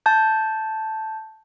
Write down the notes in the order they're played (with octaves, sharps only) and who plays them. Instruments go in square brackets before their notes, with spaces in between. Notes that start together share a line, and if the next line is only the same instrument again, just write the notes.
[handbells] A5 G6